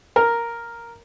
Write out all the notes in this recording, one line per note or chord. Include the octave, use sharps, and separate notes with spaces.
A#4